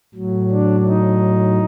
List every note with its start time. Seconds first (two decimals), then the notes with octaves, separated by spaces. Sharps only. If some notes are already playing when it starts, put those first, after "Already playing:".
0.15 A2 F#3
0.51 D4
0.86 D#4